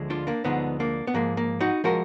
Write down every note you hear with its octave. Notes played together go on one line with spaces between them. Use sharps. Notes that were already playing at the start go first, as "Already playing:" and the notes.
Already playing: D2 D3 F3 G#3
D4 F4
A#3 D4
D2 D3 F3 G#3 B3 D#4
A#3 D4
B3
G#2 F3 G#3 A#3
A#3
D#4 F#4
F3 G#3 F#4 A#4